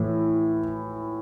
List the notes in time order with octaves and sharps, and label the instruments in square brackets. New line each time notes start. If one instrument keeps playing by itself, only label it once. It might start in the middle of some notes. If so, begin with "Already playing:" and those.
Already playing: [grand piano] A2 E3